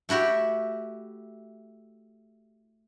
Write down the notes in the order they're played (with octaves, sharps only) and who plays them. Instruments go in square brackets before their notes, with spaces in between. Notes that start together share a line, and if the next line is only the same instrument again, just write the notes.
[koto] A3 E4 F#4 G4